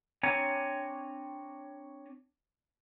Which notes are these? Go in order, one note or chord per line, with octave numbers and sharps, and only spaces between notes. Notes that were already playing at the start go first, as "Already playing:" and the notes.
C4 D4 C#5 G#5 A#5